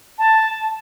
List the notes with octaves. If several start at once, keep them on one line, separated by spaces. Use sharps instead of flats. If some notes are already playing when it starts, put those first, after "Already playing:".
A5